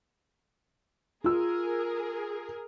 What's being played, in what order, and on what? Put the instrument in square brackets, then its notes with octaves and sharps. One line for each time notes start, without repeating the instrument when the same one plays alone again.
[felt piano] F4 E6 [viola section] G#4 A#4